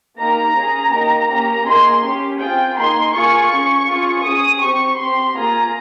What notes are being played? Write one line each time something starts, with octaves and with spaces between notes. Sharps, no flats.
A#3 D#4 G4 A#5
C#4 G#4
A#3 D#4 G4
A#3 C#4 G4 A#5
A#3 D#4 G#4 C6
C#4 G4
C4 F4 G#4 G5
A#3 D#4 G#4 C6
A#3 F4 G#4 C#6
C#4 G#4
C#4 F4 G#4
C#4 G#4 D#6
C4 G4 C#6
C4 G4 C6
A#3 F4 G#4 A#5